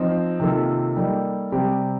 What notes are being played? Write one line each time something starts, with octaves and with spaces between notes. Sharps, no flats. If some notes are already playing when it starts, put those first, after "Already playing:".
Already playing: F3 C4 D#4
C3 D#3 A#3 F4 A4
G3 A#3 D#4 A4
C3 G3 C4 G4